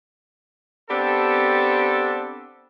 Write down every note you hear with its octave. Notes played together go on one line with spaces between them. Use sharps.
B3 C4 D4 G4 A4